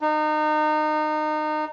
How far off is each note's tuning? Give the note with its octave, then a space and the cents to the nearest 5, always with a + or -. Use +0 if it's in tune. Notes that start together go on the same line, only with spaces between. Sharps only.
D#4 -30